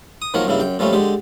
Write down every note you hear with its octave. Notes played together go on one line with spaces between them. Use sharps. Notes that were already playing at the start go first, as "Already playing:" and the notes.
D#6
D#3 F3 F#3 A#3 A#4 C#5
G2 C#3 A#3 E4
F#2 G5
A#2 F3 G3 A3 C#4
D3 G#3 G4